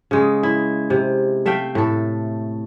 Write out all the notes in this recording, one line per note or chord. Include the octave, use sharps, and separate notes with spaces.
C#3 G#3
E4
C3
A3 E5 F5 G5
A2 A4